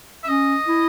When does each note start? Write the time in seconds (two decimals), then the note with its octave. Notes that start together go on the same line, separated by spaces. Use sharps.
0.24 E5
0.28 C#4 D#5
0.68 E4